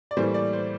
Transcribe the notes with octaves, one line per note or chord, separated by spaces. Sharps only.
D5
A2 E3 G3 A#3 C5
D5
C5